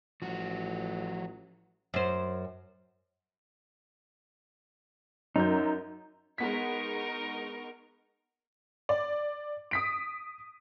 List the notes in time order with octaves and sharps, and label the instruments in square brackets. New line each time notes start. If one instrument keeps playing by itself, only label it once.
[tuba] A1 [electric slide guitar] F3 F#4
[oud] F#2 C5
[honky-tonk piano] F#2 F#3 G6 [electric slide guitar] D#4
[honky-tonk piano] G#3 B3 B6 [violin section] D#4 A#4 C#6
[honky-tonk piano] D5
D#6 B6 D7